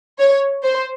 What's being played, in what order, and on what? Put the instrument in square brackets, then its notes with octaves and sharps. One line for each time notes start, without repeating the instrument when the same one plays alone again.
[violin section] C#5
C5